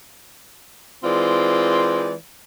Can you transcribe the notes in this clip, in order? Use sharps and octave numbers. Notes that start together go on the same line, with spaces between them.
E3 G#3 C4 F4 D5